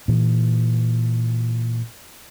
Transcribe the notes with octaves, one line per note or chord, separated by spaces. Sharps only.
A#2 E3